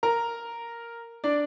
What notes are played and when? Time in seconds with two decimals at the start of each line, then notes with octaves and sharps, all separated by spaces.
0.03 A#4 A#5
1.24 D4 D5